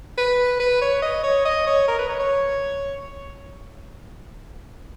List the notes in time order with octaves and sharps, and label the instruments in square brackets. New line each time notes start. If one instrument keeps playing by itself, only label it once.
[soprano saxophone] B4
B4
C#5
D#5
C#5
D#5
C#5
A#4
B4
C#5
C#5